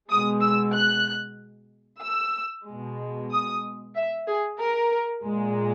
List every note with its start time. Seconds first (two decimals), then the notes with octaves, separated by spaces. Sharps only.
0.10 B2 G#3 D#6
0.42 E6
0.75 F#6
2.03 E6
2.67 B2 G#3
3.31 D#6
3.95 E5
4.28 G#4
4.59 A#4
5.23 A#2 G#3